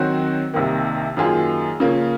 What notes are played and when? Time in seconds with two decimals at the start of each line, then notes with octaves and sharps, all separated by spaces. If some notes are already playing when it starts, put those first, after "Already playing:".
Already playing: D#3 F#3 C4 F#4
0.53 C2 C3 D#3 A#3
1.17 F#2 D#3 A#3 F4 G#4
1.80 C#3 F3 A#3